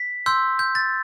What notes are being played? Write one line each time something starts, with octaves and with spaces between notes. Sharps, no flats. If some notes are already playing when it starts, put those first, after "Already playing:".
Already playing: B6
C6 E6 G6
G6
A6